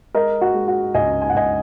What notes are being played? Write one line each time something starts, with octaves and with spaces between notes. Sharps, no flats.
G#3 A#4 D#5
F#4
G#3
F#4
C#2 D#5 G#5
G#5
F#5
C#2 D#5 G#5